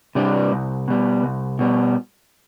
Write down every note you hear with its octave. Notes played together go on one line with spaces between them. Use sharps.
C3 G3 D4
C2
B2 G3
C2
B2 G3